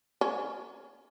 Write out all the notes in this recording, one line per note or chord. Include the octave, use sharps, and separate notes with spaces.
C#4